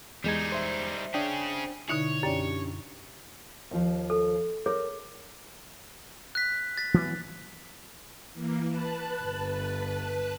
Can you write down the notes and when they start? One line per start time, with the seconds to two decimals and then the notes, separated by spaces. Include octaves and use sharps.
0.24 E2 G3 G#3 D#4 G#6
0.52 C5 E5
1.14 C#4 D4 G#4 G5
1.89 B2 D3 D#4 E4 C#5
2.23 F#2 C#4 D4 G4
3.71 D#2 F3
4.10 A4
4.66 G#4 A#4 C#5
6.35 F#6 B6
6.77 A6 B6
6.94 E3 F#3 B3
8.34 E3 A#3
8.68 B4 A5 F#6
9.21 G1